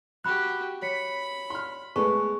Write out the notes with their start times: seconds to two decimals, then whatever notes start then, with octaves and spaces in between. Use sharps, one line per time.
0.24 F#4 G4 B5 F#6
0.82 C#5 B5 B6 C#7
1.50 C6 F6
1.96 G#3 A3 B3 G#4 C#6